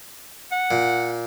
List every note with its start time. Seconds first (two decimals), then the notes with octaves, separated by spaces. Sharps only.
0.52 F#5
0.71 A#2